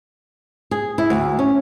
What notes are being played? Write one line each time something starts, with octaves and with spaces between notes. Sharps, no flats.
G#4
E4
D2
C#4